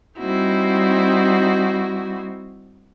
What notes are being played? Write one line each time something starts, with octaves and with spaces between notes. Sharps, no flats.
G3 C4 D#4 E4 F#4